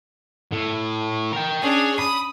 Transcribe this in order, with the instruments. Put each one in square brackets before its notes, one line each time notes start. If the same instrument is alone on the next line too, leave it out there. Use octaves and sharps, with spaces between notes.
[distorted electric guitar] A2
A#4 G5
[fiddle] C#4 D4 [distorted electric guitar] G#4
[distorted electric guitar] B5 [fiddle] D#6